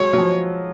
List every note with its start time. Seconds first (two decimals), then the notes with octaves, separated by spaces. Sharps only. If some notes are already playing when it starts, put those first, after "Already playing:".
Already playing: F#3 G#3 C#5
0.13 F#3
0.18 F3